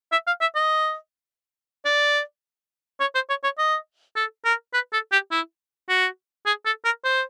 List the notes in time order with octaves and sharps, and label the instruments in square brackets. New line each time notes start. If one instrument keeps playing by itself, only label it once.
[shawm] E5
F5
E5
D#5
D5
C#5
C5
C#5
C#5
D#5
A4
A#4
B4
A4
G4
E4
F#4
G#4
A4
A#4
C5